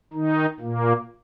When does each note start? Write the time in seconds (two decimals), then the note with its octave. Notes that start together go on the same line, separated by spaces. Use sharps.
0.13 D#3 D#4
0.60 A#2 A#3